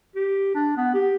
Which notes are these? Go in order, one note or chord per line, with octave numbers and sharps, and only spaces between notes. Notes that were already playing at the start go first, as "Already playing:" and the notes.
G4
D4
B3
G4